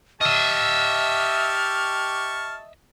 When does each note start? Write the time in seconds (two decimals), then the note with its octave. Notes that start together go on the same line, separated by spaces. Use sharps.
0.21 G4 D#5 E5 A5 C#6 F6